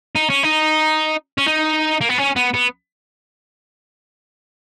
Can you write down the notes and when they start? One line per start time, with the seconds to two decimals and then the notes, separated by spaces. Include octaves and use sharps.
0.16 D#4
0.30 C#4
0.43 D#4
1.38 C#4
1.46 D#4
2.01 A#3
2.09 B3
2.18 C#4
2.36 B3
2.54 B3